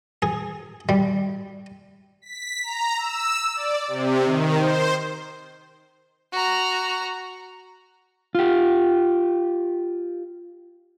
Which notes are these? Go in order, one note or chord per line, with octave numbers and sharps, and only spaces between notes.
G#4
G3
B6
A#5
E6
D5
C3
D#3
C5
F#4 A#5
F4 G4